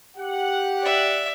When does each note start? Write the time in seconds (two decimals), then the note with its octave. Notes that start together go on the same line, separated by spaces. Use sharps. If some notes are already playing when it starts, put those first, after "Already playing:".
0.17 G4 F#5
0.83 D5 E5